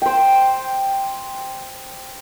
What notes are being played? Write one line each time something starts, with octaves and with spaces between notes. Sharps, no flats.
C5 G5